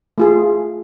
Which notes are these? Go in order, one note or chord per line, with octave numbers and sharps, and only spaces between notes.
A3 F4 G#4